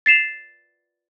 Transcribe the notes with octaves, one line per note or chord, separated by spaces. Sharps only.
A6 C7 E7 F7